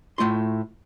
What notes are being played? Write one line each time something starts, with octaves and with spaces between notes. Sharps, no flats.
A2 A3 F4 C6